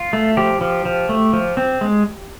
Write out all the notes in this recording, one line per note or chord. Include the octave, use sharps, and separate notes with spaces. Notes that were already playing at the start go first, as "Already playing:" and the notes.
Already playing: F4
A3
F3 G4
F3
F3
A3
F3
C4
G#3